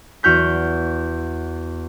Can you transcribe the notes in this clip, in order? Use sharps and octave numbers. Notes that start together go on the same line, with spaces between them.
E2 F#4 F6 G6 B6